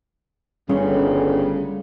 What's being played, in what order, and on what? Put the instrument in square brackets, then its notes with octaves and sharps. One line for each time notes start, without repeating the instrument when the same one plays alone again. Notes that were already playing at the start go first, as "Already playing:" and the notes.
[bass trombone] G1 [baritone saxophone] C#3 [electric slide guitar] G3 A3 D#5 [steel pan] C#4